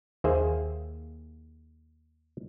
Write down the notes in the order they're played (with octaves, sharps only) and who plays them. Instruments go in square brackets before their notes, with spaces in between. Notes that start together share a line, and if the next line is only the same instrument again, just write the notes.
[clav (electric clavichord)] D#2 A#3 G#4 C5 E5